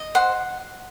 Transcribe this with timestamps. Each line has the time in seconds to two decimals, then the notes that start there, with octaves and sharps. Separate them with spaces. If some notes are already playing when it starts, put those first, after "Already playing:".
Already playing: D#5
0.15 C5 F#5